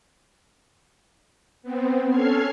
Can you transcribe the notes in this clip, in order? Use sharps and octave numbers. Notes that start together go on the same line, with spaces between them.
B3 C4
C#4 A4 F6 G#6 C7